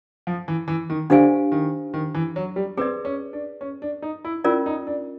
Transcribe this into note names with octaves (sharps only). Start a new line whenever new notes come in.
F3
E3
E3
D#3
D3 D4 G4 C5 F5 G#5
D#3
D#3
E3
F#3
G3
C4 G#4 B4 D5
C#4
D4
C#4
D4
D#4
E4
C#4 E4 F4 A#4 D5
D#4
D4